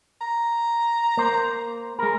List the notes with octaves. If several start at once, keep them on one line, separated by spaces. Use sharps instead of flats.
A#5
A#3 C5
G#3 A#4